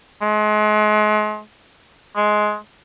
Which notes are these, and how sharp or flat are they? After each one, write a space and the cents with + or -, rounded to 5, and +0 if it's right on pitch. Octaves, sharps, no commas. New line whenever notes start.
G#3 +35
G#3 +15